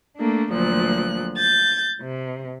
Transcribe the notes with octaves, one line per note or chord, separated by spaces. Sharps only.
A3 A#3 D4
D2 A#2 F3 F#3 F#6
G6 A6
C3